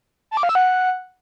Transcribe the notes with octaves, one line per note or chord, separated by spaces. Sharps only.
A5
D6
F5
E6
F#5